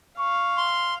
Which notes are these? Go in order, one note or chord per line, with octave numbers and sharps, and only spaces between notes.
F5 C#6
C6